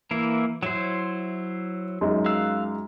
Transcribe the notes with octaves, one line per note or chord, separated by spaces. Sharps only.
E3 A#3 E4
F#3 E4 C5 E7
F#2 G#3 D#4
F5 E6 F#6